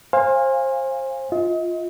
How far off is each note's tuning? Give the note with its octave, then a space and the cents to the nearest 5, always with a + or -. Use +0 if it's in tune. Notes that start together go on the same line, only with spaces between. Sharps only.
C5 +25 F5 +5 G#5 -25
F4 +0 D#5 +35